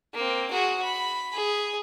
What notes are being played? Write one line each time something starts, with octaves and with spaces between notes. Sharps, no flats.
A#3 C4
F#4 G#4
B5
G#4